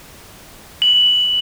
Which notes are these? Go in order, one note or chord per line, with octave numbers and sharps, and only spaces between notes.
F#7